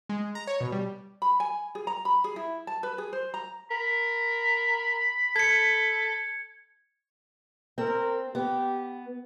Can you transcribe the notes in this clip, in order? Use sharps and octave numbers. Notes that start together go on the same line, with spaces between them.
G#3
A#5
C#5
B2
G3
B5
G#5
G#4
A#5
B5
G#4
E4
A5
B4
G#4
C5
A#5
A#4 B5
A4 G#6 C#7
C4 A#4
B3 G4